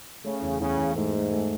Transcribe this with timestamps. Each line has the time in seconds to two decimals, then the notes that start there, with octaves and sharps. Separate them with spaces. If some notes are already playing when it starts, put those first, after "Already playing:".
0.24 C#3 A3
0.42 E2
0.60 E2 C#3
0.77 E2
0.95 G#2 A3
1.14 A3
1.31 A3